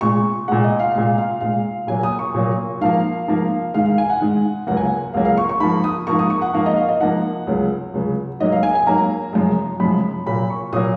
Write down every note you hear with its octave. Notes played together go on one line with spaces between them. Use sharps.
A#2 G#3 C#6
A#2 G#3 F#5
D#5
F5
A#2 G#3 F5
F5
A#2 G#3 F5
A#2 F#3 A#3 G#5
D#6
C#6
A#2 F#3 A#3
G#2 F3 A#3 F5
G#2 F3 A#3
G#2 D#3 G#3 F5
F5
G#5
F#5
G#2 D#3 G#3
C#2 C#3 F#3 A#3 F#5
G#5
F#5
C#2 C#3 F#3 A#3 F5
F5
C#6
C#6
G#2 F3 A#3 B5
D#6
G#2 F3 A#3 C#6
D#6
C#6
F#5
G#2 F3 A#3 F5
D#5
F5
D#5
G#2 F3 A#3 F#5
C#2 C#3 F#3
C#2 C#3 F#3
G#2 F#3 A#3 D#5
F5
G#5
G#5
G#2 F#3 A#3 A#5
F#2 C#3 F3 G#3
F#2 C#3 F3 G#3 B5
A#2 F#3 A#3 B5
C#6
A#2 F#3 A#3 D#6